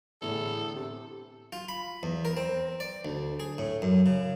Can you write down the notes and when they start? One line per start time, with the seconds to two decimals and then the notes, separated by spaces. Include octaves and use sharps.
0.22 E2 A2 D3 A4 A#5
0.75 C3
1.53 F4
1.69 B5
2.03 E2
2.25 A#4
2.37 C4
2.80 D5
3.05 D2
3.40 G#4
3.58 A2
3.82 F#2
4.06 C#3